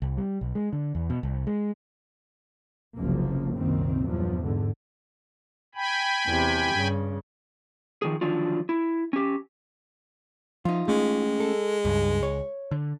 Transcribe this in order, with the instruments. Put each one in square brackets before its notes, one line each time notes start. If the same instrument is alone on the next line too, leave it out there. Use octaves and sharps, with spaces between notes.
[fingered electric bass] C2
G3
B1
G#3
D3
E2
B2
C2
G#3
[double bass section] F#1 C2 F#2 F3 A#3
C2 F#2 A#2 D#3 C4
E2 G2 F3 F#3
G#2 D3
[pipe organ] G5 G#5 B5
[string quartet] E2 C3
G2 C#3
[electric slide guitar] D#3 F3 G#4
D3 D#3 F3 F#3 D4 F4
E4
C#4 G4
[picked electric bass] F3 [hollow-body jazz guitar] D#4 F4
[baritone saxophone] G#3 [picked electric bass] A3 C#4
[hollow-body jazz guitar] A4
[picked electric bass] C#2 [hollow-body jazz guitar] G2
[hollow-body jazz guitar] C#5
[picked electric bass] D3